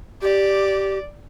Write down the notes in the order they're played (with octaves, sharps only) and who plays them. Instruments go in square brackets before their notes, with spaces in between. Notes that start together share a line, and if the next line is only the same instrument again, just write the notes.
[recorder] G4 [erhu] D5